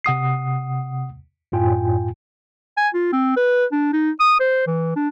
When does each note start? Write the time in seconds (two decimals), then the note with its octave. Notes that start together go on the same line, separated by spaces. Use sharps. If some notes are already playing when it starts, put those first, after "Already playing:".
0.04 C3 F#5 D#6 C7
1.52 F#2 A2 F4 G5 G#5
2.77 G#5
2.94 F4
3.13 C4
3.37 B4
3.72 D4
3.93 D#4
4.20 D#6
4.40 C5
4.67 E3
4.96 D4